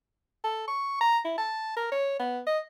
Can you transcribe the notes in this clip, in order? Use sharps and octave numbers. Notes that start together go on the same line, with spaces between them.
A4
C#6
A#5
E4
A5
A#4
C#5
B3
D#5